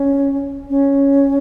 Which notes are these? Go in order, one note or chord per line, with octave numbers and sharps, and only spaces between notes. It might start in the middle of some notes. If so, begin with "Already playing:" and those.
Already playing: C#4
C#4